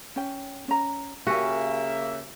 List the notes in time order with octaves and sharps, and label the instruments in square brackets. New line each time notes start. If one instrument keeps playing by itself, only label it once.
[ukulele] C#4 G5
C#4 A#5
[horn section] C#3 A#3 E5 [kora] F#4 [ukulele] G4 A#4 G#5